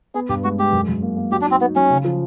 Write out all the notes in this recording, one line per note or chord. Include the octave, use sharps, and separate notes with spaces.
B3 G#4
G2 G4
G#3 F#4
G#3 G4
F#2
F#2
A#3
A#3
F#3 G4
D4
D#4
C4
B3 D#4
F#3 C#4
C#3
F3